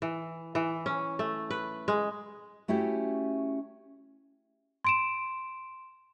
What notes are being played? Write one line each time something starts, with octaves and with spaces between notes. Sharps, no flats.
E3
E3
C#4
A3
B4
G#3
A3 C#4 E4 F#4 G4
C6 D7 E7